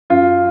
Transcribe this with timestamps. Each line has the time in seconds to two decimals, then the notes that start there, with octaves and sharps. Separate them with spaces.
0.10 F#2 F4